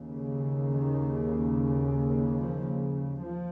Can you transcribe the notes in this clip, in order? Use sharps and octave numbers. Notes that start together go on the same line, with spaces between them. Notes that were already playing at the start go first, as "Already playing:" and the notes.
Already playing: D#2 C#3
D#3
F3
F3